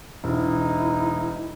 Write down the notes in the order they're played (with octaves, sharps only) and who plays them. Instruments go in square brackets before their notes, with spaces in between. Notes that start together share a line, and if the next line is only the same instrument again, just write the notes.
[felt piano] E1 [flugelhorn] D#4 [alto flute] E4